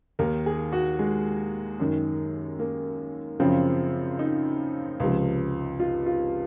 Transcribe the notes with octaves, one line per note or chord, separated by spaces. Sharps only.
D#2 D#3 A#4
G#4
F#4
G#3
F#2 D#3
A#3
F#2 C#3 F3 C4
D#4
C#2 C3 F3
F4
F4